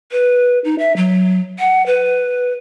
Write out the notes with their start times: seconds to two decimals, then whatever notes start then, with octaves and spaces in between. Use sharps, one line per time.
0.12 B4
0.64 D#4
0.79 E5
0.96 F#3
1.59 F#5
1.86 B4